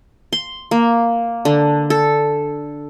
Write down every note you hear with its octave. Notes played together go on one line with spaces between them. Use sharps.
C6
A#3
D3
A4